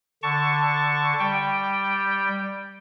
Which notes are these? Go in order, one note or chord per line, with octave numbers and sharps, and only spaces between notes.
D3 A5 C#6
G3 G5